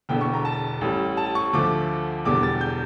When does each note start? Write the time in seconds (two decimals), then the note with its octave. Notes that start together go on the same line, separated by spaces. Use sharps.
0.09 E1 E2 D3 G5
0.21 C#6
0.33 A#5
0.45 A5
0.81 A1 A2 G3
1.17 A5
1.35 C#6
1.53 D2 D3 F3 A3 D6
2.25 E1 E2 D3 G3 D6
2.43 A6
2.61 G6